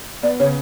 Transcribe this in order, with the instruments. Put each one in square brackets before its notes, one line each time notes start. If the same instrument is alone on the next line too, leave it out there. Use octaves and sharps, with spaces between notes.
[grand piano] B3 [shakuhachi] D5
[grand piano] C#3 [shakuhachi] C#5